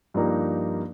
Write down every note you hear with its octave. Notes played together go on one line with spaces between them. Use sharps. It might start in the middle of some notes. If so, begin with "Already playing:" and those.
G2 F3 A#3 D#4 G4